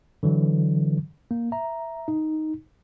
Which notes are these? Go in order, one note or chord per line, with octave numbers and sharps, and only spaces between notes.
D3 E3 F#3
A#3
E5 A#5
D#4